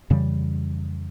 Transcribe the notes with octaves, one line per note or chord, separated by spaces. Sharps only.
F2 C#3 E3 G3